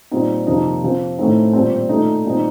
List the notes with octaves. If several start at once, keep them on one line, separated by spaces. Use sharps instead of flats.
A#2 G3 C4 D#4
F2 C3 F3 A#3 D#4
C3 F3 C4
A2 A3 C4 D#4
A#2 G3 C4
A#2 A3 D#4
A#2 G3 C4 D#4